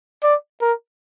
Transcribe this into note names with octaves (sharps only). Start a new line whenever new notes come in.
D5
A#4